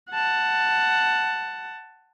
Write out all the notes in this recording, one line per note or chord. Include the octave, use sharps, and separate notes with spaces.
F#5 A5